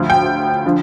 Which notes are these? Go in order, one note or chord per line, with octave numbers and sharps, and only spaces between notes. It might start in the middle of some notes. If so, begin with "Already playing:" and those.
Already playing: D2 D3 F3
G5
D3 F3